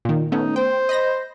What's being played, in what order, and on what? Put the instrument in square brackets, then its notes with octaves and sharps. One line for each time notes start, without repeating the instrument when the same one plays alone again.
[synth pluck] A#2 D#3
[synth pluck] A3 B3 C#4 [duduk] D#4
[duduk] C5 [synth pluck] G5
[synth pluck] D#5 B5 A#6